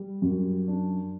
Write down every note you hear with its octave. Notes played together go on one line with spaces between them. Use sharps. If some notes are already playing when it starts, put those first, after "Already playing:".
Already playing: G3
F#2
D4